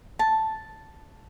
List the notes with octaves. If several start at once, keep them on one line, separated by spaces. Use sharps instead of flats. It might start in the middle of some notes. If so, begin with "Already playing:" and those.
A5